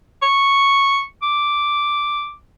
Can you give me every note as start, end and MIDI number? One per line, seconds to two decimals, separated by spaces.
0.22 1.03 85
1.23 2.33 86